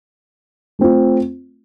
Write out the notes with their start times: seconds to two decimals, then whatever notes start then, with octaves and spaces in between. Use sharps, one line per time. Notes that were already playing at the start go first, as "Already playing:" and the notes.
0.79 A3 C4 F4